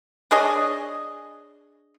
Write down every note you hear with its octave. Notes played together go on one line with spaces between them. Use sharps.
D4 G#4 C#5 D#5